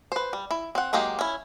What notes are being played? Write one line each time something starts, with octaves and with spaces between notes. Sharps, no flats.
B4 C5
G3
E4
C4 F#5
F#3 G#3 A#3 D#4 G4
C#4 E4